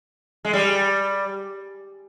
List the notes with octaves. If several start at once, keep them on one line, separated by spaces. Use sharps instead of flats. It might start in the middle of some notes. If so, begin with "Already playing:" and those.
G#3
G3